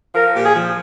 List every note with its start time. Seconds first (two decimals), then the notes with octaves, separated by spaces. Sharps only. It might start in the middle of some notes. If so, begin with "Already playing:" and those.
0.14 F3 A#4
0.33 A#2 G4
0.44 G#4
0.53 F3